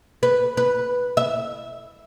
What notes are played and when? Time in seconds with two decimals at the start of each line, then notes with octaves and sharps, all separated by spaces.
0.23 B4
0.57 B4
1.17 E5